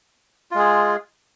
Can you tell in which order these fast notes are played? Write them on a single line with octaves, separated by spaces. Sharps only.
F4 G#3 G#4